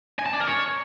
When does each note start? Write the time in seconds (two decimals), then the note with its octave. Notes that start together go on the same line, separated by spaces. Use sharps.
0.19 G#5
0.26 A5
0.33 D5
0.40 A#4
0.47 C#5